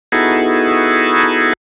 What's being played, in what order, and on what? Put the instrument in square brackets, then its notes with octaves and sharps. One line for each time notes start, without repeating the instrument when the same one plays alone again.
[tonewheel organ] B3 D#4 E4 F#4 G#4 A4